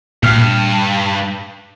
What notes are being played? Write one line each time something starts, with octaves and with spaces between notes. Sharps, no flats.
G2 A#2 F6